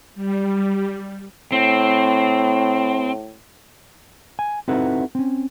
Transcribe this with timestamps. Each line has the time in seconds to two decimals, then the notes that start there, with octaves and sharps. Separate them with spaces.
0.15 G3
1.52 A2 C4
4.39 G#5
4.68 C4 D#4 E4 F#4 A4 B4
5.15 C4 C#4